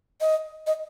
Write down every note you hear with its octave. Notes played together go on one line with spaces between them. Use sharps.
D#5
D#5